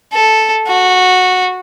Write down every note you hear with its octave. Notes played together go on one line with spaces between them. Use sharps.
A4
F#4